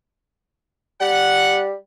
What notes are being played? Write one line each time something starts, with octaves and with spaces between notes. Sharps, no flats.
G3 F#5